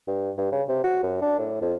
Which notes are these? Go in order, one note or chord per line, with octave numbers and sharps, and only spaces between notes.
G2
G2
C#3
C3
F#4
F#2
D4
A2
F2